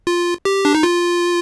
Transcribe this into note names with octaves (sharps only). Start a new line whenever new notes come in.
F4
G4
D4
D#4
F4